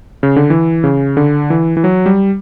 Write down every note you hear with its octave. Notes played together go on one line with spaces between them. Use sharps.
C#3
D3
E3
C#3
D3
E3
E3
F#3
G3